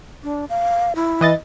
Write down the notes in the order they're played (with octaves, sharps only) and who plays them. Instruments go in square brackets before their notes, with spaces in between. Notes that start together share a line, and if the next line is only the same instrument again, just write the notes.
[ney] D4
F5
E4
[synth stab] E3 D#5 A6